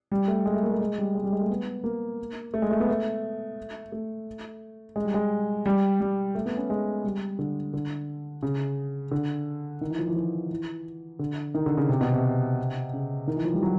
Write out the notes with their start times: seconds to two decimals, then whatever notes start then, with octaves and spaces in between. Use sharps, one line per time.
0.12 G3
0.28 A3
0.46 G#3
0.54 A3
0.63 A#3
0.72 A3
0.80 G#3
0.98 G3
1.15 G#3
1.24 G3
1.32 G#3
1.41 A3
1.50 B3
1.84 A#3
2.54 A3
2.62 G#3
2.71 A3
2.80 B3
2.89 A3
3.92 A3
4.96 G#3
5.05 G3
5.14 G#3
5.66 G3
6.01 G3
6.35 A3
6.46 B3
6.57 C#4
6.70 G#3
7.04 G3
7.39 D3
7.74 D3
8.43 C#3
9.11 D3
9.81 D#3
9.90 E3
9.99 F3
10.08 E3
10.16 F3
10.51 E3
11.19 D3
11.54 D#3
11.66 D3
11.77 C#3
11.89 C3
12.01 B2
12.13 C3
12.93 C#3
13.27 D#3
13.36 E3
13.45 F3
13.54 G3
13.63 F#3